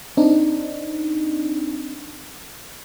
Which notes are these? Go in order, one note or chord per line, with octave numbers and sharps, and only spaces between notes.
C4 D4 D#4